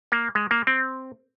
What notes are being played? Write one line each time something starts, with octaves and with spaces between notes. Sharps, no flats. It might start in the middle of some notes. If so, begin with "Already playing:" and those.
A#3
G#3
A#3
C4